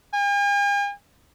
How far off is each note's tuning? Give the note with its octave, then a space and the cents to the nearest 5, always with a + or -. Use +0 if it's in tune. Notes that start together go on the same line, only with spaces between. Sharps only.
G#5 -45